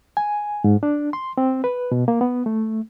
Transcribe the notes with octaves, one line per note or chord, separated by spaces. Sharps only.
G#5
G#2
D4
C6
C4
B4
B2
A#3
B3
A3